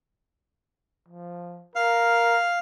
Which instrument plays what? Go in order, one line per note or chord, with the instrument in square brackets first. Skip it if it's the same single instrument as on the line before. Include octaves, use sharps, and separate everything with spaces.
[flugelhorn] F3
[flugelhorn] A#4 [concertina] F5